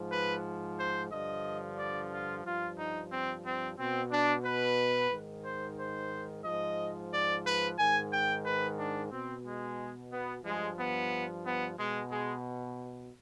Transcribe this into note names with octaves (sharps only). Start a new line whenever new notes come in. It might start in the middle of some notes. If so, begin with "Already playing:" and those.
Already playing: G#2 F3
B4
C5
G2 D3 F3 D#5
D5
F4
G2 F3 F4
D#4
C4
C4
B2 C4
D4
B4
G#2 D#3
C5
C5
G#2 F3 D#5
D5
B4
G#2 D#3 G#5
G5
B4
D4
B2 C4
G#3
B3
G2 F3 G#3
B3
B3
B2 G#3
G#3